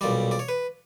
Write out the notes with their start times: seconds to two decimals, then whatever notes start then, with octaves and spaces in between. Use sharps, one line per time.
0.01 B1 A#2 G3 D5
0.31 D5
0.39 C#5
0.48 B4